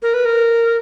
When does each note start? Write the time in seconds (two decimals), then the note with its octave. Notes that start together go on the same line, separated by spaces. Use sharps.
0.02 A#4
0.14 B4
0.25 A#4